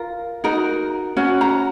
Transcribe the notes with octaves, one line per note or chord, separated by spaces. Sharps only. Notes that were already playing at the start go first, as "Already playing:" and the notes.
Already playing: F4 A#4
D#4 F#4 A#4
C#4 F#4
A#5